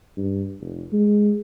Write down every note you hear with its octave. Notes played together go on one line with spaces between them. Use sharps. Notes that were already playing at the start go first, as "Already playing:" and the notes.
G2
F1
G#3